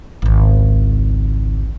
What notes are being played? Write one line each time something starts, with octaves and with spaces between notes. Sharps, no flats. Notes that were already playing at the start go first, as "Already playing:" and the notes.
G#1 C#2